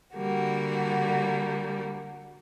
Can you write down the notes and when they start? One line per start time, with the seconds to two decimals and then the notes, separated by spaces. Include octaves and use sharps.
0.15 D3 G3 A#3 F#4